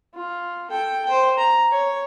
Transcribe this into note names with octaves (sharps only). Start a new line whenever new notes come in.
F4
A4 G5
C5 G5
A#5
C#5